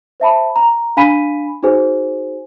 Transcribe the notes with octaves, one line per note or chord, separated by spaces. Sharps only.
C5 E5 A5 B5
A#5
D4 F5 G#5 B5 B6 D#7
D#4 F#4 G#4 C5 G#5